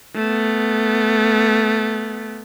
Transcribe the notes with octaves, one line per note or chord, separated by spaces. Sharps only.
A3 B3